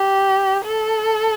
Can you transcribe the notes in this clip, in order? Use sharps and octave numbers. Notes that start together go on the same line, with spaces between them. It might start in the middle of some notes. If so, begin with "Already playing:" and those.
Already playing: G4
A4